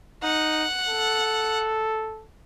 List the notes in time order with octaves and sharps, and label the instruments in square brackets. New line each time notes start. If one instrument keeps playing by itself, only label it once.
[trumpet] D#4 [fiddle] F#5
[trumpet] A4